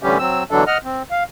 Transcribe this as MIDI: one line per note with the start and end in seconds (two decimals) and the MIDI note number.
0.03 0.18 45
0.03 0.18 50
0.03 0.18 52
0.03 0.18 55
0.03 0.18 61
0.03 0.18 67
0.19 0.44 54
0.19 0.44 60
0.19 0.44 88
0.51 0.64 47
0.51 0.64 50
0.51 0.64 52
0.51 0.64 54
0.51 0.64 62
0.51 0.64 69
0.67 0.78 75
0.67 0.78 78
0.67 0.78 89
0.84 1.03 60
1.11 1.24 77